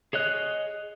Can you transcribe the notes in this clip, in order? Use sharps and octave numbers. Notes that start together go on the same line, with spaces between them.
G#4 C#5 D#5 F#6